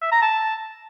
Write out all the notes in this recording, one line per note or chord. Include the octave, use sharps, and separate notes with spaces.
E5
A#5
A5